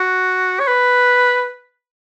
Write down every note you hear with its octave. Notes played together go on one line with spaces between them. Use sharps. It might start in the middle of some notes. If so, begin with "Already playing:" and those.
Already playing: F#4
C#5
B4